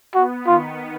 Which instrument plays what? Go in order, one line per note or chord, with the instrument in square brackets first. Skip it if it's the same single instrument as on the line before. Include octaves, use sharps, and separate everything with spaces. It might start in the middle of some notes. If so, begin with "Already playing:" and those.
[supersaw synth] B3 [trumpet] F#4
[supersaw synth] D#3 [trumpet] F4